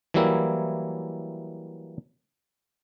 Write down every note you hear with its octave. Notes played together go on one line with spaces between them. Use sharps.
E3 F#3 G3 A#3 E4